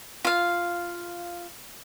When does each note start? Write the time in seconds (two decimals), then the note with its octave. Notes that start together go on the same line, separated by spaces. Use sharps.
0.25 F4 F5